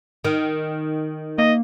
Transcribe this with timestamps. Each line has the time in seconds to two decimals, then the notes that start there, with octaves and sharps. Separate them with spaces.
0.25 D#3
1.38 A#3 D#5